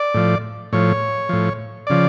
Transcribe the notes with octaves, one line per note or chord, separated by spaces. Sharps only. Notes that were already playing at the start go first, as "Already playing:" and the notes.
Already playing: D5
A2 F3
A2 F3 C#5
A2 F3
C#3 F3 D5